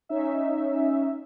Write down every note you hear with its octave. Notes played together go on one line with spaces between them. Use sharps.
C#4 D#4 E5